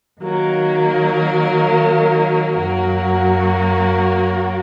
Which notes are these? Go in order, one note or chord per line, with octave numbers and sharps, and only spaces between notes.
D#3 F#3 A#3
F#2 F#3 A#3 F#4